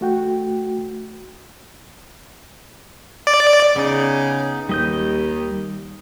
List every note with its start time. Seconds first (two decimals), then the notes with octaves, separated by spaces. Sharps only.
0.01 A3 F#4 G5
3.27 D5
3.76 C#3 B3 D#4
4.69 D#2 G3 D#5 G6